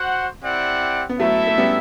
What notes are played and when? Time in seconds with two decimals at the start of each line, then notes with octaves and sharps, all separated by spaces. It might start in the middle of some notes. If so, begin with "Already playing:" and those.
Already playing: F#4 C5 F#5
0.43 C4 E4 G4 D5 F#5
1.09 B3
1.19 F#3 A3 E4 A4 E5
1.47 A3
1.58 G3 B3